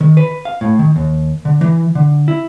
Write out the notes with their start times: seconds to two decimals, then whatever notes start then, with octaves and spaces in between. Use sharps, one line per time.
0.01 D#3
0.17 B4
0.45 F5
0.61 A2
0.79 D#3
0.96 D#2
1.45 D3
1.61 E3
1.95 D3
2.28 E4